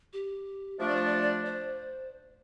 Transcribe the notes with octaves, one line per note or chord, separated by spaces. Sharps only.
G4
F3 A3 D4 E5
D5
C5
D5
D5
C5